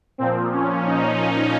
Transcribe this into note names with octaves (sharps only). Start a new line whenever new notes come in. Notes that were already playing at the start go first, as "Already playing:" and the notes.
A#2 F3 C4
C#4
D#4